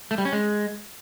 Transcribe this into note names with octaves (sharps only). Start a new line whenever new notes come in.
A3
G3
C#4
G#3